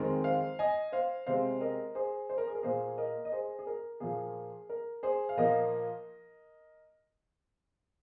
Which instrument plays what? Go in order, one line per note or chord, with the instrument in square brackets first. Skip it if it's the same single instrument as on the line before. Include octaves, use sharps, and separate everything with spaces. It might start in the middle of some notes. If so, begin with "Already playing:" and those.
Already playing: [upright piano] F2 D#3 G#3 C4 A#4
C5 F5
D#5 G#5
C5 F5
C3 G#3 C4 C5 F5
A#4 D#5
G#4 C5
C5
A#4
G#4
A#4
A#2 A#3 G#4 C5
A#4 D#5
D#5
G#4 C5
G#4
A#4
A#2 F3 A#3 G#4
A#4
G#4 C5
F5
A#2 F3 A#3 A#4 D#5